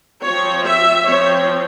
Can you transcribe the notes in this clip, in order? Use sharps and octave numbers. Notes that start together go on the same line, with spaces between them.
F3 C4 C#5
E5
F3 C4 C#5